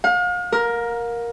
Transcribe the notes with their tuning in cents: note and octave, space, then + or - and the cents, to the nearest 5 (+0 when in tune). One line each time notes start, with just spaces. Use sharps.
F5 +40
A#4 +10